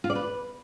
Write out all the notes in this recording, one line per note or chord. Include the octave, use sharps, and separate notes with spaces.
F4
D5
B4